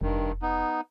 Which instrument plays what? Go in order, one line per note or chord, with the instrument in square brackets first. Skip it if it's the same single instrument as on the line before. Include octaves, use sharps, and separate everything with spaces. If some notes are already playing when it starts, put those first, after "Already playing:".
[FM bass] F1 [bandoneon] G2 D#3
[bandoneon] B3 D#4